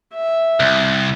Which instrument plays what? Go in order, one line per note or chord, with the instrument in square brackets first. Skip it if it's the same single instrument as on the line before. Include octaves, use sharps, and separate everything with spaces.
[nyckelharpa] E5
[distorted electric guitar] C2